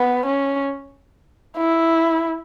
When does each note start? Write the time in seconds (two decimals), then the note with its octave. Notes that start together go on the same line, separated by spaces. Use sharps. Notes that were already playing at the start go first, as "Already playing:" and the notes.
Already playing: B3
0.26 C#4
1.58 E4